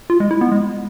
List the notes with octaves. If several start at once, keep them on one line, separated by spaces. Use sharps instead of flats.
F4
G#3
E4
B3
G#3